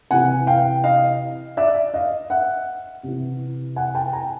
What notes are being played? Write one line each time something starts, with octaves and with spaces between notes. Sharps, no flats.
C3 E3 F#5 G#5
F5 G5
D#5 F5
D5 E5
D#5 F5
E5 F#5
C3 E3
F#5 G#5
G5 A5
G#5 A#5